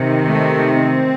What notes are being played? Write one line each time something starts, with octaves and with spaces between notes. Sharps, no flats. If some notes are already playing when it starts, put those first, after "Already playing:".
Already playing: C3 D#3
A3
C4